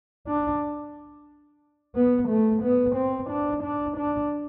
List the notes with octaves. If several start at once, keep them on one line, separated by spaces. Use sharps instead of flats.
D4
B3
A3
B3
C4
D4
D4
D4